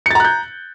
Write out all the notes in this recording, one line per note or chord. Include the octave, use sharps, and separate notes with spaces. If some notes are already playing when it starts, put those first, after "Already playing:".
A#5 F#6 G6 A6 C#7